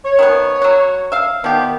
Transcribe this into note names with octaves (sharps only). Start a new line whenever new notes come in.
C#5
D#3 F3 B3
F#3 F#4
E5 F5
D#3 F3 B3 G4